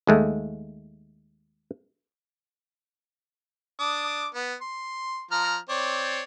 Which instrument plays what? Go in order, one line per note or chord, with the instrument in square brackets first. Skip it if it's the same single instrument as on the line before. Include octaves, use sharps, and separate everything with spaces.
[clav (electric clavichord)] D#2 G#3 A3
[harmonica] D4 D6 D#6
B3
C6
F3 A#5 F6
C4 C#5 D5